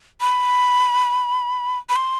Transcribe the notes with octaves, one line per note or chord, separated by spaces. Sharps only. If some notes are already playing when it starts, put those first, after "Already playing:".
B5
B5
C6